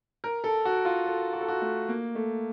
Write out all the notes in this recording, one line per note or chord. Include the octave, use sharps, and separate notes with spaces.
A#4
A4
F#4
F4
A4
F#4
A4
F#4
A3
A#3
A3